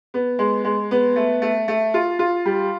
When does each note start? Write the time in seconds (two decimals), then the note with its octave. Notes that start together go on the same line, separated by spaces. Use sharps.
0.14 B3
0.39 G#3
0.64 G#3
0.91 B3
1.16 A3
1.42 A3
1.68 A3
1.94 F4
2.19 F4
2.46 G3